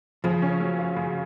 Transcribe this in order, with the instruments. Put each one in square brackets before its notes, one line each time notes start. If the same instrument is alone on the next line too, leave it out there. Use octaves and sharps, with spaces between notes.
[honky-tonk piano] C#3 [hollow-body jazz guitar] F3
[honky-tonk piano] C#4
F#3
F4
C#3